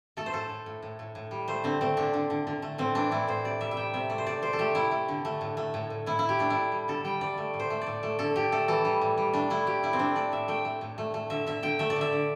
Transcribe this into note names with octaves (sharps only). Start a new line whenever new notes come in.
A3 A4
C5
A2 A4
A2
A2
A2
A2
A2
G3
A3 C5
D3 C4
A3 C4
D3 D4
D3
D3
D3
A3
A2 C4
E3 D4
A2 E4
A2 C5
C3 D5
G3 E5
E5
C3 G5
C3 E5
A3 D5
C5
A2 D5
A2 C5
A4
A3 G4
A3 E4
A3
D3
A3
A2
A3
A2
A2
A2 E4
A2 E4
G4
A3 D4
E4
A2
G3
D3 A4
G3 G5
G3 D5
A3
A2
C5
A3
A2 D5
A3
D3 A4
D3 G4
A3 A4
E3 A4
G3
A2
G3
A3 D4
A3 E4
A2 G4
A2 E4
C4
A3 D4
A3 D5
A2 E5
A3 G5
A3
A2
A3
A3
D3 E5
D3 E5
D3 G5
A3 E5
D5
D3 E5
D3